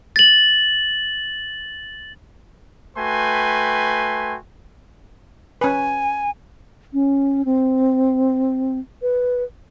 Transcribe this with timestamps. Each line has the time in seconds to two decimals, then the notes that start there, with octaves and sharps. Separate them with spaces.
0.16 A6 F#7
2.97 A3 F#4 B4 G5 G#5 C6
5.61 C#4 B4 G#5
6.93 C#4
7.45 C4
9.02 B4